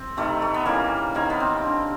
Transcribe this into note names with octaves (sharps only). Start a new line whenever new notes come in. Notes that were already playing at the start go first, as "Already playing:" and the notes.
Already playing: C4
C3 D#3 G3 A3
A3
B3
C#3 E3 G3 A#3
C3 D#3 G3 A#3
B3
C4
D3 G3